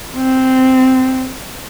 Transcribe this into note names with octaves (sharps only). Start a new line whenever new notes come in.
C4